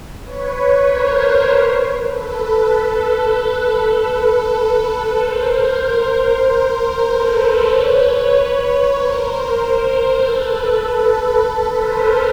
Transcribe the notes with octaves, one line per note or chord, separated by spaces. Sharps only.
B4 C#5
A#4 C5
A4 B4
A4 B4
A#4 C5
A#4 C5
A4 B4
A#4 C5
B4 C#5
A#4 C5
A4 B4
A4 B4
A#4 C5